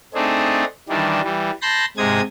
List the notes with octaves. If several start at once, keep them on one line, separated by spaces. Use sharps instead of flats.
A3 C4 D4 D#4 G#4
D#3 E3 G3 D4
E3 G3
A5 B5 C6 G6 A#6
G#2 C3 G#3 D#6 G#6